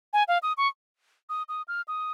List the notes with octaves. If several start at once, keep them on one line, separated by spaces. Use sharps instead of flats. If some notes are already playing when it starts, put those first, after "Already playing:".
G#5
F5
D#6
C#6
D#6
D#6
F6
D#6